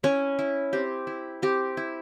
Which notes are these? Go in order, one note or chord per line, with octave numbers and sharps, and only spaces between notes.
C#4 E4 C#5
E4
C4 G4
E4
C4 G4
E4